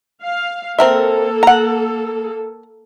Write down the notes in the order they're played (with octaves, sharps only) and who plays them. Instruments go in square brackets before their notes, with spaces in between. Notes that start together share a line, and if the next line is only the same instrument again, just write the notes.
[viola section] F5
[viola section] A#3 A4 [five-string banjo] C4 A#4 E5
[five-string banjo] F#5 A#5